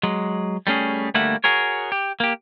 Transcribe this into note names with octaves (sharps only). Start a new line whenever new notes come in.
F#3 G#3
G3 A3 C#4 G#4
D2 G3 A3 A#3 E5 F#5
F#4 G#4 A#4 C#5
G4
A#3 G4